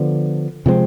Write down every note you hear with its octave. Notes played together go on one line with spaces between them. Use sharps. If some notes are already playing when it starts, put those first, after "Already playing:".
Already playing: D3 F3 B3 D4
C3 F3 G#3 C4